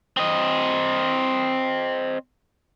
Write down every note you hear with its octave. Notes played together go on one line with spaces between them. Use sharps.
C4 D#5